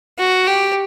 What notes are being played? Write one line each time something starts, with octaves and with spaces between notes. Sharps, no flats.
F#4
G4